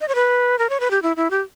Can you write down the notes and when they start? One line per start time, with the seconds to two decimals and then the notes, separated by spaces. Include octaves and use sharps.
0.01 D#5
0.08 C#5
0.15 B4
0.59 A#4
0.70 C#5
0.80 B4
0.91 G4
1.03 E4
1.17 E4
1.31 G4